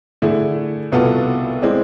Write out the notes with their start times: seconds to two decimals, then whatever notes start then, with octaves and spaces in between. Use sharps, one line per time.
0.22 D3 A3 E4 G#4
0.92 C2 B2 B3 F4 A4
1.62 G#3 C4 E4 G#4 D5